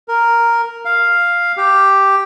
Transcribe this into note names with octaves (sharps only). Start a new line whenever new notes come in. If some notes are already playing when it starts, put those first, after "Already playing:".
A#4
F5
G4